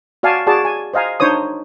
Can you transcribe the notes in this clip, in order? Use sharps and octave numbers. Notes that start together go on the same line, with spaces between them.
F#4 D5 F5 G#5 A5
F#4 G#4 D5 A5
G#5
C5 D#5 F5 G#5 A#5
D4 D#4 C5 C#5 D#6